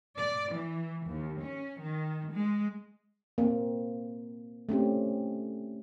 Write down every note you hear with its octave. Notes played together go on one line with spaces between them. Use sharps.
D5
E3
D#2
C#4
D#3
G#3
A#3 C4
A3 C4 C#4 G4